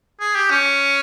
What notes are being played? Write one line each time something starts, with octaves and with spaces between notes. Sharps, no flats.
G#4
G4
C#4